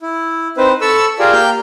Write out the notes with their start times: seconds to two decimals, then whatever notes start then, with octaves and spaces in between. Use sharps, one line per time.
0.01 E4
0.57 C4 D#4 B4 C5
0.81 A4 A5 B5 C#6 E6
1.19 F4 G4 G#4 A#4 D5
1.33 A#3 G4 F6 G6